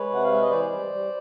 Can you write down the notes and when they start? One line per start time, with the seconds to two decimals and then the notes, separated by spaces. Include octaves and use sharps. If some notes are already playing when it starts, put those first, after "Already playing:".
Already playing: G#3 B4 C#5
0.10 C3 F#5
0.24 F5
0.31 G#3 E5
0.42 D#5
0.50 E3 C5 D5
0.72 G3
0.93 G3